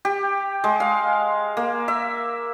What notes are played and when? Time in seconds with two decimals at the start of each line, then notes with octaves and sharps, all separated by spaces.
0.05 G4
0.64 G#3
0.80 F5
1.57 A#3
1.88 E5